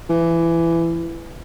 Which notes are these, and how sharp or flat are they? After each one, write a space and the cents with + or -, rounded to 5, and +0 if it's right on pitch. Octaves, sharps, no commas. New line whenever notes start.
E3 +20